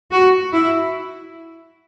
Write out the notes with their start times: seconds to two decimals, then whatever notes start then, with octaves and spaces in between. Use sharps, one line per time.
0.13 F#4
0.53 E4